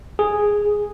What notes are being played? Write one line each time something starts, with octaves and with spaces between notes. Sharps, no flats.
G#4